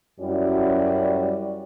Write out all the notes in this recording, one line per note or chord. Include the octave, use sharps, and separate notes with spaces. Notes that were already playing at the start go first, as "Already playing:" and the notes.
F#2 G3 C#4 E4 F#4 D5